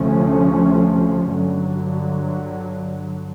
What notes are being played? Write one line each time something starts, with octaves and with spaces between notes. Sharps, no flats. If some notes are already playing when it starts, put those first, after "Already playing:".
Already playing: D2 C3 F3 A3 C#4
G2 D3 F#3